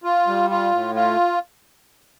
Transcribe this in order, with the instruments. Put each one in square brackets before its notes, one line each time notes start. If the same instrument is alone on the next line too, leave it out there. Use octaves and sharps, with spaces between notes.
[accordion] F4
G3
F4
A2
F4